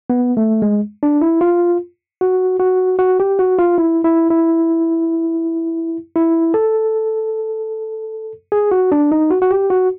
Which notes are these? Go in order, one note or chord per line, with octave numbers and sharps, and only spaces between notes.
B3
A3
G#3
D4
E4
F4
F#4
F#4
F#4
G4
F#4
F4
E4
E4
E4
E4
A4
G#4
F#4
D4
D#4
F#4
F#4
G4
F#4